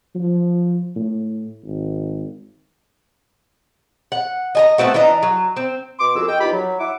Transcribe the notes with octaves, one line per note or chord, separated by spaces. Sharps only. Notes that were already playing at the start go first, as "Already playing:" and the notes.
F3
A2
G#1
F#5
D#5 G#5 A#5
A3 B3 C4 F#4
E3 D4 D#5 A#5
F#3
C4
B2 C6 D6
C2 F2 F#4 G#4 E6
D#5 G5
E2 D#4 F4 G4 B5
F#3
E4 E5 F#5 D6